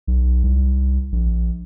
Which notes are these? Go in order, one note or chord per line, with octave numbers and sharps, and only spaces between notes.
B1
C2
A#1